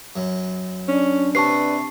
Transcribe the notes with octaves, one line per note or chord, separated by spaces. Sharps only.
F#2
C#4 D4
C3 B4 A5 C#6 C7